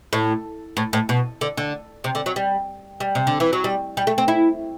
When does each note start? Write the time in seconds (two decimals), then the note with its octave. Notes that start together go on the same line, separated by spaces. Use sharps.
0.13 A2
0.77 A2
0.93 A2
1.09 B2
1.41 D3
1.57 D3
2.04 C3
2.15 D3
2.26 F#3
2.36 G3
3.00 G3
3.15 C3
3.27 D3
3.40 E3
3.53 F#3
3.64 G3
3.97 G3
4.07 A3
4.18 C4
4.28 E4